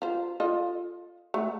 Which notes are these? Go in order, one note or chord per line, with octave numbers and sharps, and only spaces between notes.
F4 C5
F4 A4 D#5
A3